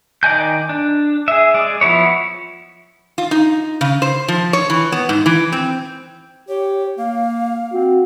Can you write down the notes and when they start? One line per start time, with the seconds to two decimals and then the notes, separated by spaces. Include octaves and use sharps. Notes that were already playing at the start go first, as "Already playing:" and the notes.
0.23 D#3 D5 D#5 G#5 G6
0.69 D4
1.28 G#4 E5
1.54 G#3 D5
1.81 F3 B3 E4 C#5
3.18 F4
3.31 D#4
3.81 C#3
4.02 C5
4.28 F3
4.53 C#5
4.70 E3
4.92 B3
5.09 G#2
5.26 E3
5.52 C4
6.49 G4 C#5
6.98 A#3 F5
7.73 C4 F#4